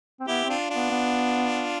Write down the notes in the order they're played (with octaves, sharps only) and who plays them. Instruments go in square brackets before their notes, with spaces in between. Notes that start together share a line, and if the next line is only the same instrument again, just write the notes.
[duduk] C4
[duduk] B3 [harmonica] E4 G4
[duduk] C4
[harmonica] D4 F4
D4 F4
[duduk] B3
B3